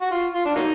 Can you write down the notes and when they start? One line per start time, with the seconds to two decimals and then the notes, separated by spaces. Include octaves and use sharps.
0.02 F#4
0.11 F4
0.34 F4
0.45 D4
0.55 F#3 A#3 D#4